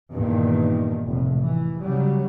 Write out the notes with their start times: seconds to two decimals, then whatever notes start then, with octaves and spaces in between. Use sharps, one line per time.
0.15 E2 G2 A#2 D#3
1.06 F1 A2
1.39 E3
1.80 C#3 F#3 G3